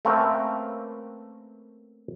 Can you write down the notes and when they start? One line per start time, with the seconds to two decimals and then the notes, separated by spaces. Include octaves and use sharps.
0.05 A3 A#3 C4 C#4 A#4 B4